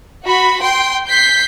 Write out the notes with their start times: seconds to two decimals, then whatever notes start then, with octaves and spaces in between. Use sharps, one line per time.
0.24 F#4 B5
0.60 G5 C6
1.07 G6 B6 C7